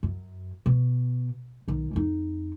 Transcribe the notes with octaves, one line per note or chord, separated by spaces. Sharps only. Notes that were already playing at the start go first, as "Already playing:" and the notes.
F#2
B2
B1 D#3
F2 D#4